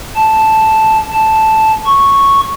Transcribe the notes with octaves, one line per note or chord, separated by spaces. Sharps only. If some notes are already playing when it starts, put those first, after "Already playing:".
A5
A5
C#6